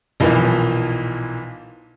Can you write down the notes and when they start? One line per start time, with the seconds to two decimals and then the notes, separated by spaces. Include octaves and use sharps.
0.20 B1 A#2 E3 F3